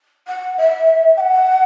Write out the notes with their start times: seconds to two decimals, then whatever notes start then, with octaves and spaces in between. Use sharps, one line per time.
0.27 F#5
0.57 E5
1.17 G5
1.20 F#5